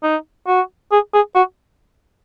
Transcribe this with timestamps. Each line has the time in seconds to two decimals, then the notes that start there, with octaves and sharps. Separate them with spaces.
0.03 D#4
0.47 F#4
0.92 G#4
1.14 G#4
1.35 F#4